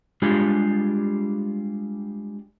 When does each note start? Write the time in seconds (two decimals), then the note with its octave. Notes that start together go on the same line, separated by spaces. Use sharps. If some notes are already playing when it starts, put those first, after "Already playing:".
0.22 G3 G#3 D4 F4 G4 G#4